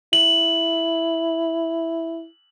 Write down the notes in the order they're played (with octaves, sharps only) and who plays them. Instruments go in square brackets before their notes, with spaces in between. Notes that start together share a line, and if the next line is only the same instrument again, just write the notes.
[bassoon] E4 [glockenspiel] F#7